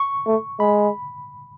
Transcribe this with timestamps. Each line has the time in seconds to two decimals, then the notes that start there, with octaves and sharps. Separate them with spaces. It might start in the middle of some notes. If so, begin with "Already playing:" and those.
Already playing: C#6
0.26 A3
0.60 G#3 B5